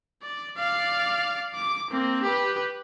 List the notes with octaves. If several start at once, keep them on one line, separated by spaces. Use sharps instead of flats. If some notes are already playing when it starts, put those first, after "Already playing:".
D5
D5 F5
D6
A#3 C4
G4 B4